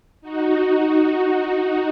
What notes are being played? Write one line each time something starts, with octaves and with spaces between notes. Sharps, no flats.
D#4 F#4